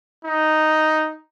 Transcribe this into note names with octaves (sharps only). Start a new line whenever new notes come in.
D#4